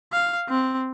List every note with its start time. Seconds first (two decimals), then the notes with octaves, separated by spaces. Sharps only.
0.13 F5
0.49 C4